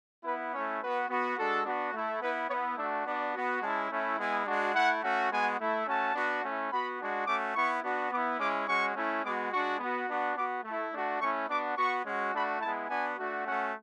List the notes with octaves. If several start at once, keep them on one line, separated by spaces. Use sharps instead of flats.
B3 E4 B4
A3 C#4 E4 C#5
B3 F#4 B4
B3 F#4
G#3 D4 F#4 A4
B3 D4 F#4
A3 E4
B3 E4 B4
B3 E4 C#5
A3 D4 F#4 E5
B3 D4 F#4 D5
B3 F#4
G#3 C#4 E4 A5
A3 C#4 E4
G#3 B3 E4 G#5
G#3 D4 F#4
A3 E4 F#5
A3 C#4 F#4
G#3 B3 F#4 G#5
A3 E4
A3 C#4 F#4 A5
B3 D4 F#4
A3 C#4 E4
B3 F#4 B5
G#3 D4 F#4
A3 C#4 F#4 D6
B3 E4 C#6
B3 D4 F#4
B3 E4 D6
G#3 C#4 E4 D6
G#3 C#4 F#4 C#6
A3 C#4 E4
G#3 B3 F#4 D6
G#3 D4 F#4 C#6
B3 F#4
B3 D4 F#4
B3 F#4 D6
A3 E4
A3 D4 F#4
A3 C#4 E4 C#6
B3 D4 F#4 D6
B3 F#4 C#6
G#3 C#4 F#4
A3 D4 F#4 B5
G#3 B3 E4 A5
B3 D4 F#4 G#5
A3 D4 F#4
A3 C#4 F#4 F#5